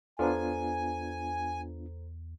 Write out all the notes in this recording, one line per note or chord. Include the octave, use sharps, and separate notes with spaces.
E2 B3 D4 F4 A4 C5 G#5 A#5